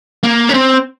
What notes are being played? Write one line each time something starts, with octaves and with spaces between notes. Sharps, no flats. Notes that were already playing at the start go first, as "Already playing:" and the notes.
A#3
C#4
C4